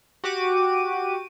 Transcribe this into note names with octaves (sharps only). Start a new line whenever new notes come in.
F#4 G4 D6 D#7